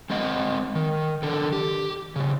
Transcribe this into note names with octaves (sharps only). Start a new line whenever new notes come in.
G#3 C4 D#5 F#5
D#3
D3 D#3 A4
G4
A2 C#3